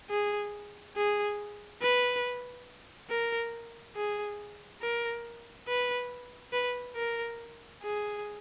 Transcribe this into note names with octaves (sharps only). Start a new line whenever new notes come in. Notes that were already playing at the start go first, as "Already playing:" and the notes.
G#4
G#4
B4
A#4
G#4
A#4
B4
B4
A#4
G#4